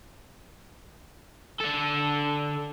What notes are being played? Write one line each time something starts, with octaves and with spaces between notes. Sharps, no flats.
D3 A4